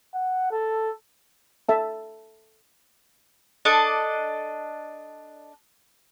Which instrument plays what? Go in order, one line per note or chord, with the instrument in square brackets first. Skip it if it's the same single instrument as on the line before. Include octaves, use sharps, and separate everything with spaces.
[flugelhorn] F#5
A4
[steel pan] A4 E5 A5
[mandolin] D4 A4 D#5 D6